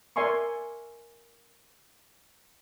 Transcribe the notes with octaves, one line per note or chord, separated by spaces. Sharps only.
A#4 D5 E5 G#5 C6 C#6